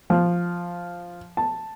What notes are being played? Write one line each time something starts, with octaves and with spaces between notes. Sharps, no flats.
F3
A5